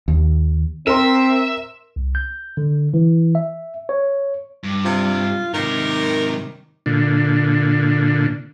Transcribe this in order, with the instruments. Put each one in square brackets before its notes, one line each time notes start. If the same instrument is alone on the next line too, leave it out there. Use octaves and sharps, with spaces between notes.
[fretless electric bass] D#2
[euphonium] C4 [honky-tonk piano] A#4 C6 [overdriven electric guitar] E5
[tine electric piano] C2
G6
D3
E3
E5
C#5
[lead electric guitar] G2
[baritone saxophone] C3 [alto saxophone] F4
[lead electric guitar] G#2 C3 [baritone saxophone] D#3 [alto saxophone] A#4
[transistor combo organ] A#2 D3